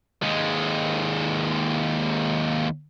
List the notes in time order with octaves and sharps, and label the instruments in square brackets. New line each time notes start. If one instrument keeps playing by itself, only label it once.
[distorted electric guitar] D#2 G#3